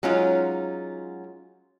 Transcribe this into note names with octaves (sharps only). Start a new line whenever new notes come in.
F#3 G#3 C#4 D#4 F4